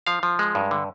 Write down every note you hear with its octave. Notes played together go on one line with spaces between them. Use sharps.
F3 F5
F3
G#3
G2
D3